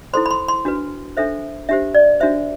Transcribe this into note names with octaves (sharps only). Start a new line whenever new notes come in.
E4 A4 C5 C6
B5
C6
C6
D4 F#4 B4
D4 A4 C5 E5
D4 G4 C5 E5
D5
D4 F#4 C5 E5